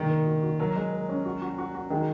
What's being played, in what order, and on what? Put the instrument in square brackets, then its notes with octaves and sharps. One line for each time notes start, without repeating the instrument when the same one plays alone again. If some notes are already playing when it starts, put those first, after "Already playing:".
Already playing: [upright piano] A#2 D#3 [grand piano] G#3
[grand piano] A#4
F#4
F#4
[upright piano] F#3 [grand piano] A#4
[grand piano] G#3
A#4
C#4
F#4
F#4
F#4
F#4
[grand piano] D#3 [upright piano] G#3